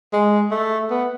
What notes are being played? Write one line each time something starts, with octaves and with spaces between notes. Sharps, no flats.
G#3
A3
B3